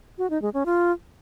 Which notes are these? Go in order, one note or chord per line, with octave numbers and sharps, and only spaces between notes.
F#4
D#4
G#3
C#4
F4